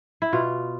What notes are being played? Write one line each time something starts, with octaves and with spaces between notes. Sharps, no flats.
E4
B2 F4